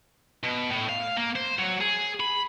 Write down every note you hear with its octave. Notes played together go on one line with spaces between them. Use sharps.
B2
A2
F5
A#3
C5
F#3
G#4
B5